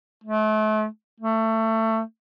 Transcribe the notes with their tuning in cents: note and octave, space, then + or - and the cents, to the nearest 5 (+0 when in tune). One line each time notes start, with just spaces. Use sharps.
A3 -35
A3 +20